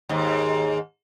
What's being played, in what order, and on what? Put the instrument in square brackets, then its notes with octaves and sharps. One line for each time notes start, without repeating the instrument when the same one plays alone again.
[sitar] D#2 G#2